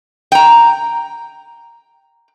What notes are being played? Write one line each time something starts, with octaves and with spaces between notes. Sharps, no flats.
G5 A#5